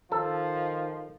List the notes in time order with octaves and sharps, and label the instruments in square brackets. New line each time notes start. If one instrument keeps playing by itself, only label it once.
[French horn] D#3 [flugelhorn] F3 [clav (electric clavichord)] A4